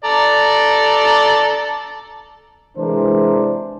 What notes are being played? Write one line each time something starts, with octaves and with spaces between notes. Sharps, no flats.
A4 D5 A#5
C3 E3 G#3 D4 A#4 C5